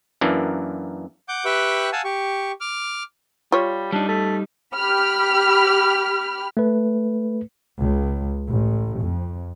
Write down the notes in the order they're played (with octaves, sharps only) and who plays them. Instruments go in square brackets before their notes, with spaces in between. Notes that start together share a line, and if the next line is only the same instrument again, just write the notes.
[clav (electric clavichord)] F#2 E3 A#3 D4
[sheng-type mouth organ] F#5 D6 G6
G4 B4 E5 G5 C#6 F#6
F5 F#5 G#5 A5 E6
G4 C#6
D6 F6
[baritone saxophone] G3 [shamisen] F4 C#5
[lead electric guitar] G3 D#4 [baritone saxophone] D4
[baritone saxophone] A3
[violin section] G4 B5 F6
[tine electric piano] A3 B4
[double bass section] C#2
A1
F2